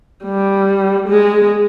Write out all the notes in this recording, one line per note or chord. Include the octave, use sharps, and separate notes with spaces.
G3
G#3